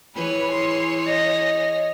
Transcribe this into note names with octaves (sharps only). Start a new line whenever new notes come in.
E3 G#4 B4 C#5
C6
D#5 A#6